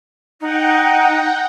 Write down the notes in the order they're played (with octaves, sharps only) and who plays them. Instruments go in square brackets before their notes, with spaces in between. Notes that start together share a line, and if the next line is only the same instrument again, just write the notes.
[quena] D#4 [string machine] F#5 G5